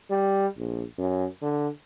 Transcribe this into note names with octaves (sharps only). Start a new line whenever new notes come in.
G3
A#1
F#2
D3